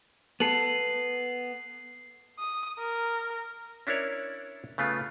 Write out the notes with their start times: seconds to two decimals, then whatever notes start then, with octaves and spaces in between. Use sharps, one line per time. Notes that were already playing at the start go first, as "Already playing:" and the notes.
0.40 B3 A4 C7 F#7
2.39 D#6
2.79 A#4
3.87 C#4 D4 E4 A#4 C#5 D5
4.78 C#3 A3 B3 F4